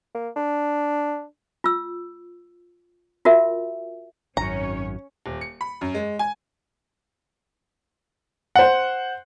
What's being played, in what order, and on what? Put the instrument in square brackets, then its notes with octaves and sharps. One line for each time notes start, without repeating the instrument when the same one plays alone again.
[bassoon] A#3
D4
[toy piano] F4 E6
F4 F#4 A#4 E5
[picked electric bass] G#1 F#2 [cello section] C#4 C#5 [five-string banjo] A#5
[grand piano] D#1
C#7
B5
F#2
G#3
G#5
[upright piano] C5 F#5